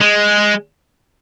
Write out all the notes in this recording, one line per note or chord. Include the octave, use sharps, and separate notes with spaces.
G#3